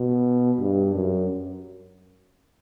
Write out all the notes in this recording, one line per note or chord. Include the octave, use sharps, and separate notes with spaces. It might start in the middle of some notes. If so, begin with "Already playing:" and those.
Already playing: B2
G2
F#2